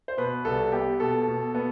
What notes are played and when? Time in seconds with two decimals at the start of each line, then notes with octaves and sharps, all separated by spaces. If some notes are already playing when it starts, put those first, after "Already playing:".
0.08 C5
0.18 B2 B4
0.45 C2 A4
0.72 B3 G4
1.00 B2 A4
1.28 B2
1.55 B3